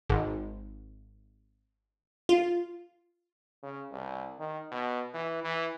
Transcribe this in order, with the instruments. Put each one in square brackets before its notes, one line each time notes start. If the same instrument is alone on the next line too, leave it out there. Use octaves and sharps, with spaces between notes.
[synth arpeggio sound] G#1
F4
[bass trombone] C#3
C2
D#3
B2
E3
E3